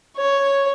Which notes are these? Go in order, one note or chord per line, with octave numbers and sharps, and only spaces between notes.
C#5